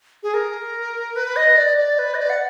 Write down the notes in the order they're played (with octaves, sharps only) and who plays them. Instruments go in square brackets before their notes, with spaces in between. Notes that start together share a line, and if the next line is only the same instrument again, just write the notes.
[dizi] G#4
A#4
B4
D#5
D5
D5
B4
D#5
D5
F#5